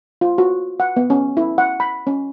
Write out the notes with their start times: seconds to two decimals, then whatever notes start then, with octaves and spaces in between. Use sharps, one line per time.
0.21 F4
0.38 F#4
0.80 F#5
0.96 B3
1.10 C#4
1.37 E4
1.58 F#5
1.80 B5
2.07 C#4